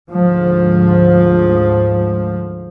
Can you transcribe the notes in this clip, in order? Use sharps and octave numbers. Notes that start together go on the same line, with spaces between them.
D2 G#2 F3